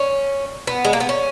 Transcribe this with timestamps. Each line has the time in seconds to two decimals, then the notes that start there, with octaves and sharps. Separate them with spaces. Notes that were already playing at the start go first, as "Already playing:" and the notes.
Already playing: C#4
0.67 B3
0.85 G#3
0.93 A#3
1.00 B3
1.09 C#4